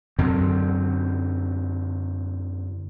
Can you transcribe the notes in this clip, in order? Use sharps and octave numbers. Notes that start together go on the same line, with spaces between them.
F#2 D3 F#3 C4